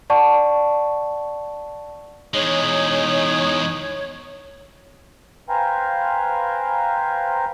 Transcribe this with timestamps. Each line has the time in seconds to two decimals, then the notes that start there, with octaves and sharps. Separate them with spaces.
0.10 D5 F#5 A5 C#6
2.34 E2 G#3 D#4 C#5
5.49 B4 C5 F5 G5 G#5 A#5